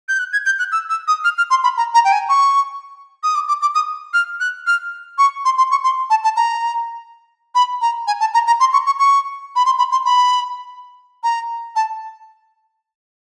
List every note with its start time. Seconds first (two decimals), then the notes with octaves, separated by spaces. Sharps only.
0.09 G6
0.19 F#6
0.33 G#6
0.46 G6
0.59 F#6
0.72 E6
0.90 E6
1.08 D#6
1.24 F6
1.38 F6
1.50 C6
1.64 B5
1.77 A#5
1.94 A#5
2.05 G5
2.12 G#5
2.29 C#6
3.23 D#6
3.35 D6
3.48 D6
3.61 D6
3.75 D#6
4.14 F6
4.40 F#6
4.67 F6
5.18 C#6
5.45 C6
5.58 C6
5.71 C#6
5.84 C6
6.10 A5
6.24 A5
6.36 A#5
7.55 B5
7.81 A#5
8.07 G#5
8.20 A5
8.34 A#5
8.47 A#5
8.60 C6
8.73 C#6
8.86 C#6
8.99 C#6
9.56 B5
9.66 C6
9.78 B5
9.92 C6
10.05 B5
11.23 A#5
11.76 A5